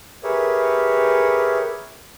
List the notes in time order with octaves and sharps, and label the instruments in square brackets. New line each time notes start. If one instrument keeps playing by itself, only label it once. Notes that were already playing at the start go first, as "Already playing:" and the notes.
[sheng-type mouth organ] G4 G#4 A#4 B4 C#5 E5